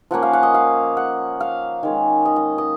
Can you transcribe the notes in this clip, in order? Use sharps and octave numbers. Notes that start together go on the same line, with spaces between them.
F3 A#3 C#4 F#5
F5
F#5
D#5
F5
F#5
F5
D#3 G#3 C#4
D#5
D#5
D#5